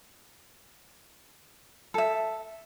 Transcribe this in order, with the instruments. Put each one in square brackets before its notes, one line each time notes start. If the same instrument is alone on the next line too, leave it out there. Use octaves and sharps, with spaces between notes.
[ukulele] A4 E5